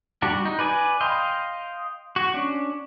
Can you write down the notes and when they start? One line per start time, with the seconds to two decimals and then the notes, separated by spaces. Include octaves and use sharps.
0.22 G3 D4 F#4 G4
0.45 D#4
0.59 B4 D5 G#5
1.00 D#5 F5 G5 C6
2.16 F#4
2.34 C#4 D4